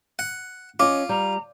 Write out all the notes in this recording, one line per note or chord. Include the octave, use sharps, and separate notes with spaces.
F#5
C#4 F4 D#5 D6
G3 A#5